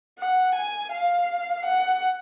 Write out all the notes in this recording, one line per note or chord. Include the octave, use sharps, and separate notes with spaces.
F#5
G#5
F5
F#5